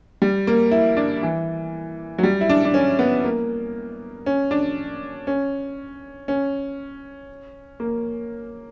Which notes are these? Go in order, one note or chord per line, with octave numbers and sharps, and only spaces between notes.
G3
A#3
E4
D4
E3
F#3
G3
E4
D4
D4
C#4
B3
A#3
C#4
D4
C#4
C#4
A#3